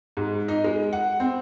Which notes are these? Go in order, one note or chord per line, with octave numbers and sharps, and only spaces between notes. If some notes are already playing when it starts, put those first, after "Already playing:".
G#2
D#4
G#3
F#5
C4